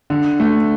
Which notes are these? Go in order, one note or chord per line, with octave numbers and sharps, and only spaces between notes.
D3
A3